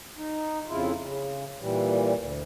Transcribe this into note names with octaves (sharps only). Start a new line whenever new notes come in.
D#4
F2 C#3 E4 F4
C#3
A#2 E3 G3
D2